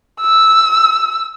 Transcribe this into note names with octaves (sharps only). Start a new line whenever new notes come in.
E6